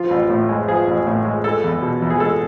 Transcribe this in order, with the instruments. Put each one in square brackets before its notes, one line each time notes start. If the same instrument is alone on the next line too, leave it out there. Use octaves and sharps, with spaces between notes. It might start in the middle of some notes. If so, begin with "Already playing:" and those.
Already playing: [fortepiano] F3 F4
A1
A2
G#3
F3 G#4
A1
A2
G#3
G#3 A4
E2
B2
E2
G#4
G#3 A4